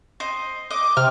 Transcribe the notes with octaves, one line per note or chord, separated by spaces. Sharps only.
C5 D#5
D#5 D6
C3 F6